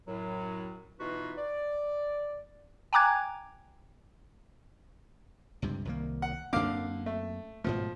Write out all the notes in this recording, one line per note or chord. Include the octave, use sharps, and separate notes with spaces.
F#2 A2 F#3
B2 E3 D#4 F4 F#4 B4
D5
G5 G#5 A#5 D6 F#6 G#6
C#2 G2 C3
C2 D#3 A#3
F#5
F#2 D3 A#3 C4 F5 D6
A3
G#2 B2 F3 A3